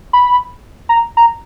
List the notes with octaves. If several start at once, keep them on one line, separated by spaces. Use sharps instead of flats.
B5
A#5
A#5